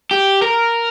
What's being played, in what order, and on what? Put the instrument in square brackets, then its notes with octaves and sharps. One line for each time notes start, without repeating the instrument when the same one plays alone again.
[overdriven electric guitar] G4
A#4